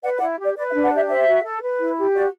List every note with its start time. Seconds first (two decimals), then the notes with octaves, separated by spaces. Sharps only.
0.03 B4 D5 F#5
0.17 D5 F#5
0.21 E4
0.39 G4 D5
0.56 B4 D5
0.70 E5
0.74 D4
0.83 D5 F#5
0.92 G4 E5
1.09 C5 E5
1.26 F#4
1.43 A4
1.61 B4
1.78 E4
1.97 G4
2.14 F#4 D5